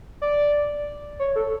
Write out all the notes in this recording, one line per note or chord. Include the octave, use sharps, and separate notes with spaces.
D5
C#5
A4